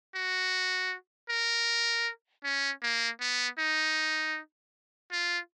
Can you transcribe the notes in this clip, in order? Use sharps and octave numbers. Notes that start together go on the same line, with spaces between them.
F#4
A#4
C#4
A#3
B3
D#4
F4